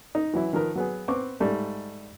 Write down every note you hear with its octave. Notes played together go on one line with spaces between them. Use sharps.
D#4
E3 F#3 E4
D#3 F3 A#4 B4
F#3 B3 G#4
B3 C4 C#6 D6
G#2 G3 A3